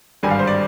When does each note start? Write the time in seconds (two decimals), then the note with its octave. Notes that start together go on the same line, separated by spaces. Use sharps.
0.23 G#1 G2 D3 G3 D4 G#5
0.31 F5
0.39 C5
0.47 D5